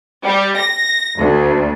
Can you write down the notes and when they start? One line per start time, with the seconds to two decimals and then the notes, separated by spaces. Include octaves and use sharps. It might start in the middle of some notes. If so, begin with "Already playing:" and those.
0.25 G3
0.57 A#6
1.19 D2